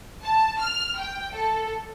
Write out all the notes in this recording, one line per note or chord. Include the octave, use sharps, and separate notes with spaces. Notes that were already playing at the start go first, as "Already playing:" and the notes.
A5
F6
G5
A4